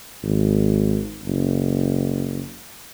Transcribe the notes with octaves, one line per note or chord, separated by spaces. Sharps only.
G#1
F#1